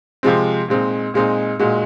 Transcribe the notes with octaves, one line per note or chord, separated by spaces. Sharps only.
C3 F3 G#3 C4
A#2 G#3 C4 D#4
A#2 G#3 C4 D#4
A#2 G#3 D#4 F#4